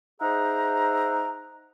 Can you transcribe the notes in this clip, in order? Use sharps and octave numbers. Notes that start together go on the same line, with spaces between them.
D#4 G#4 C5 E5 F#5 A#5